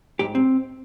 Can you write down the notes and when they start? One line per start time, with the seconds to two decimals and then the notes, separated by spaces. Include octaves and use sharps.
0.19 G#2 G4
0.35 C4